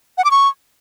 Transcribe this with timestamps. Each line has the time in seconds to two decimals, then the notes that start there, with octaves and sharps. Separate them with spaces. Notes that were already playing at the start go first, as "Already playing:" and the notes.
0.18 F#5
0.24 D6
0.31 C#6